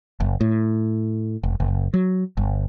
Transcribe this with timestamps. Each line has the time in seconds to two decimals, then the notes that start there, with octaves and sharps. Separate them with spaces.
0.20 F#1
0.41 A2
1.43 F1
1.60 F#1
1.94 F#3
2.37 G1